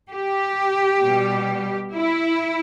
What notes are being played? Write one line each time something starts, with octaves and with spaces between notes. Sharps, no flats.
G4
B2 G3
E4